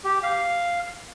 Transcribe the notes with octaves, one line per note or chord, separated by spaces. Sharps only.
G4
F5